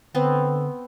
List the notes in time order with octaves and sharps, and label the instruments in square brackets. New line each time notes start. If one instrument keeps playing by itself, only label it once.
[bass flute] D3 [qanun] B3 C4